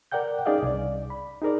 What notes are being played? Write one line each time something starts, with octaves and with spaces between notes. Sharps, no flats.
A#4 D5 F#5 G5 G6
C#4 D#4 G#4 D5 D#5 F5
C2 D5
B5
D#4 G#4 A#4 D5